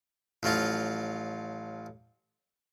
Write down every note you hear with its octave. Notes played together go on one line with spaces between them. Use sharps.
A1 F3 F#3 F4